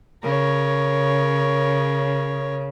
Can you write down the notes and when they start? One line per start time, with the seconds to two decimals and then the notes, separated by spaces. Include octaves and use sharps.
0.23 C#3 A#4 C#5